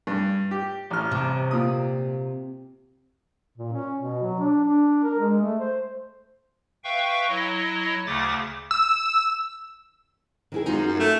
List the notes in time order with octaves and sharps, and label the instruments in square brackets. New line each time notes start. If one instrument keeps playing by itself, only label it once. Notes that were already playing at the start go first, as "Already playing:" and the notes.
[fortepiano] G2
G4
A1 F6
[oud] C3
[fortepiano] A#2 D#6
[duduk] A#2
C#4
B2
F#3
D4
D4
A#4
G#3
A3
C5
[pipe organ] B4 E5 F5 G5 C#6
F#3 E4 C#5 D#5
D2 C#3 A3 D6 D#6 A6
[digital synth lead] E6
[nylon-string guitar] D#3 E4 G#4
[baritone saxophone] F#2 [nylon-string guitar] D#4 F4
[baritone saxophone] F#2
A3